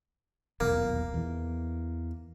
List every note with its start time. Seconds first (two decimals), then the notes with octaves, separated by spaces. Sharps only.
0.60 D#1 B1 E2 A#3
1.14 E2 E3